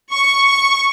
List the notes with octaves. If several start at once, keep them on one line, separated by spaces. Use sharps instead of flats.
C#6
C#6